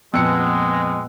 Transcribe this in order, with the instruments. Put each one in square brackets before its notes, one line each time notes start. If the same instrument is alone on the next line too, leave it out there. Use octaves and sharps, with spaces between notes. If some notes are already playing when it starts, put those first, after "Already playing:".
[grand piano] F2 C#7 [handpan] A#2 B3 [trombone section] G#3 [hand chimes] G5 E6 F#6